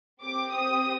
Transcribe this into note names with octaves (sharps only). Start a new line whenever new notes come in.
C4 G4 D6
D#6